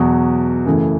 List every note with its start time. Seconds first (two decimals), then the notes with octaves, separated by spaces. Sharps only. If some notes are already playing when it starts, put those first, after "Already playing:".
Already playing: E2 B2 F#3
0.65 F#2 C#3 E3 A3